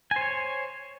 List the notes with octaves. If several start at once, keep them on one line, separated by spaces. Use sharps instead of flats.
C5 C#5 G#5